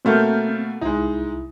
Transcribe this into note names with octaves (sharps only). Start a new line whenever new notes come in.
B2 A3 A#3 C4 F6 G6
C2 G#3 D#4 E4